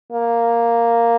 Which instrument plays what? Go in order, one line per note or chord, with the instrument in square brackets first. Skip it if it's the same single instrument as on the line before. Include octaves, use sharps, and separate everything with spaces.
[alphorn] A#3